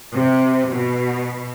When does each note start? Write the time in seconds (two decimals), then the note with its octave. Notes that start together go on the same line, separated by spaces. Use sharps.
0.11 C3
0.71 B2